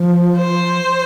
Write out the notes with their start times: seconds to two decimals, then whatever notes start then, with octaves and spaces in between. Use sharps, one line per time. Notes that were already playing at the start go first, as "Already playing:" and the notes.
Already playing: F3
0.37 C5